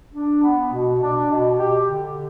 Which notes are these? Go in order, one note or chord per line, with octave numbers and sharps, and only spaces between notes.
D4
B3
B2
D4
B2
G4
D3